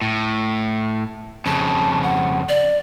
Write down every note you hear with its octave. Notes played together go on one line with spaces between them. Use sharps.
A2
F2 C#3 A5
F#5
D5